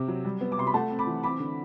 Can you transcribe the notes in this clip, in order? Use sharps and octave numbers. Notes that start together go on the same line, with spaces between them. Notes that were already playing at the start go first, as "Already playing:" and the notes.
Already playing: C3 C4
F#3
G3
B3
D6
C3 C6
B5
A3 F#5 A5
C4
B5 D6
E3
C4 B5 D6
D3